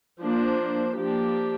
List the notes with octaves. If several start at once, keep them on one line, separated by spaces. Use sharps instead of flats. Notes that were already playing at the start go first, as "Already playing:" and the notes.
F3 A#3 D4 C5
F3 A#3 D4 G4